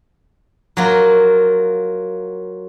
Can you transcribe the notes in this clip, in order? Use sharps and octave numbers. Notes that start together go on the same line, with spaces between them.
F#3 A#3 F4